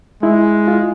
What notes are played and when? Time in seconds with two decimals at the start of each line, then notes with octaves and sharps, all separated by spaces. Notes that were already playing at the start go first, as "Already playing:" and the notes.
0.22 G#3 E4
0.68 F4